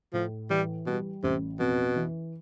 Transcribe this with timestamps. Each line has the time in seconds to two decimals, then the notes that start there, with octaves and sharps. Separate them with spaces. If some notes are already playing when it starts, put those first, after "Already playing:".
0.13 A2 F3
0.50 E3 G3
0.87 B2 G3
1.23 A1 C3
1.59 F2 B2
1.96 E3